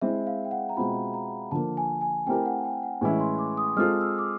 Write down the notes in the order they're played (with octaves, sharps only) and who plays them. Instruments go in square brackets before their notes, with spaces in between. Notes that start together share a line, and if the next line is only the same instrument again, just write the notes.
[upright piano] G#3 C4 E4 [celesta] E5
[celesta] F5
G5
F#5
A#5
[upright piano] B2 G#3 C4 F4 [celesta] B5
[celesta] A#5
[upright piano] D3 F3 A#3 [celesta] A5
[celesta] G#5
G#5
[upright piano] A3 C4 E4 G4 A#4 [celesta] G5
[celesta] F#5
G5
F#5
[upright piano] A2 E3 G#3 C#4 E4 [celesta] G#5
[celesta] C6
D6
D#6
[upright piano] G#3 C4 F4 A4 [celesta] F6
[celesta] E6
D6